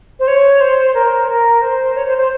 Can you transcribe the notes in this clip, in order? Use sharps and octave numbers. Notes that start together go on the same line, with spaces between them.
C5
C#5
C5
A#4
A#4
C5
C#5
C5
C5